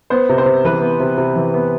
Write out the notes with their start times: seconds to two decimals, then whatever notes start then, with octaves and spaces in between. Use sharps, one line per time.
0.10 B3 C5
0.29 C3
0.38 C5
0.46 C3
0.65 E3 B4
0.82 B3
1.00 C3
1.18 C3
1.36 E3
1.54 B3